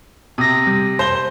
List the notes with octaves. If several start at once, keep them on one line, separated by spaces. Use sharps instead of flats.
C3 D#6 A#6
G3
C5 G7